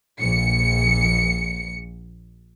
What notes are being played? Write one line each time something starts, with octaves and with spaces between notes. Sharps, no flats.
A#1 C#7